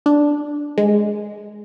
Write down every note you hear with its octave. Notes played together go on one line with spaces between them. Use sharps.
D4
G#3